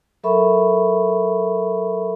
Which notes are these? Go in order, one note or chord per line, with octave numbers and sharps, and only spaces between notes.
F#3 A4 A#4 E5 B5 C#6